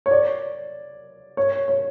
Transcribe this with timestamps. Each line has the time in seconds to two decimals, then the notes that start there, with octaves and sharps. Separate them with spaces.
0.06 C#5
0.11 D5
1.37 C#5
1.68 C#5